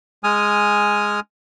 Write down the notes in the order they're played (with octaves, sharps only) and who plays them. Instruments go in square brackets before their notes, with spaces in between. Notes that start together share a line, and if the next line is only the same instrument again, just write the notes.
[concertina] G#3 G#5 D#6 F6